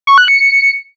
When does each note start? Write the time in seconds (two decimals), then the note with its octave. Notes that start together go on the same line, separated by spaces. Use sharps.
0.07 C#6
0.18 F#6
0.28 C#7